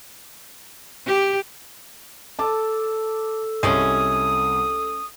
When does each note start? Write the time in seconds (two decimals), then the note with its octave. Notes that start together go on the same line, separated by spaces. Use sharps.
1.06 G4
2.39 A4 A5 D6 E6
3.63 C2 G#3 A3 C#4 D#6